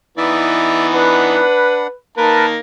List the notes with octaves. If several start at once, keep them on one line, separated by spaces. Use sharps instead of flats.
E3 B3 D#4 D5 E5
D4 B4 F#5
D#3 A#3 A#4 B4 A5